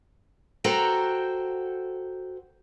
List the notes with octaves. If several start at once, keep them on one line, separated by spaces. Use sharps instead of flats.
F#4 A4 C5 F#5 G5 A#5